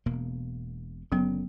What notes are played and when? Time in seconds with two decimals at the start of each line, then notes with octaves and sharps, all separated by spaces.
0.06 E1 B2 A#3
1.12 F#1 D3 F#3 B3 C#4